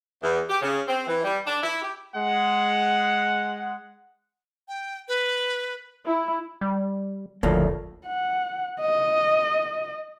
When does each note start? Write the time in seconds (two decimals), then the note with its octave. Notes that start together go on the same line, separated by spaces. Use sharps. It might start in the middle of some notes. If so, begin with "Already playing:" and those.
0.23 E2
0.50 G4
0.62 C#3
0.88 C4
1.08 E3
1.24 G3
1.47 D4
1.63 E4
1.82 G4
2.15 G#3 F#5
4.68 G5
5.08 B4
6.05 E4
6.61 G3
7.43 F#1 D2 A2 F3 A#3
8.07 F#5
8.81 D#5